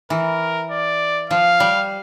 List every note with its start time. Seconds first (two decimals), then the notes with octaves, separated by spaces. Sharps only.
0.10 E3 A#4
0.71 D5
1.30 F3 F5
1.60 G3